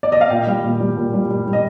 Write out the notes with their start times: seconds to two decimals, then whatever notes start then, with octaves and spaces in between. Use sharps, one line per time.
0.03 D5
0.12 D#5
0.21 F5
0.30 A#2 G5
0.47 G3
0.64 A#2
0.80 G3
0.97 A#2
1.14 G3
1.30 G3
1.47 G3
1.53 D#5